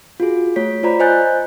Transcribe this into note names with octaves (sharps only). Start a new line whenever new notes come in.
F4 F#4 G#4
A3 C#5 B6
F4 C5 D5 A#5 B5 B6
C5 D#5 G#5 F#6 G6 A6